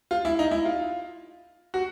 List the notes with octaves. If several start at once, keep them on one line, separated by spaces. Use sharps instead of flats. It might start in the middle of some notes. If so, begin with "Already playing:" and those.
F4
E4
D#4
E4
F4
F#4